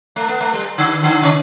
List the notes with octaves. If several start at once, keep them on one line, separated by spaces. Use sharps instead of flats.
A3
B3
A3
G3
D3
D3
C3